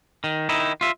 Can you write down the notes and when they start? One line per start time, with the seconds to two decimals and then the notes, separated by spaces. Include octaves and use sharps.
0.24 D#3
0.49 D#3 D#4 E4
0.81 F4 E5